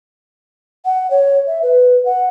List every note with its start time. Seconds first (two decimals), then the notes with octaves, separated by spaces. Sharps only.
0.85 F#5
1.10 C#5
1.47 E5
1.63 B4
2.05 F#5